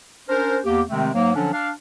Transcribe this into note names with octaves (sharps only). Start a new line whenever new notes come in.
C#4 D4 A#4 C5
E2 A#3 G4
C3 D#3 G#3 A3 C4
G#2 F#3 A#3
D3 F3 F#3 C#4 D4
D4 F5